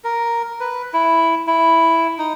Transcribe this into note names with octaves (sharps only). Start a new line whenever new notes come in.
A#4
B4
E4
E4
D#4